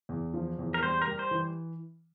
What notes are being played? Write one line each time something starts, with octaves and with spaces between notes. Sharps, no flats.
E2
F3
E2
A#4
G3 C5
A#4
G3
C5
E3